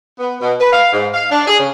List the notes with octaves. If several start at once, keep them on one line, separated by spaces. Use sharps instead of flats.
B3
B2
B4
F5
G#2
F5
D4
G#4
C#3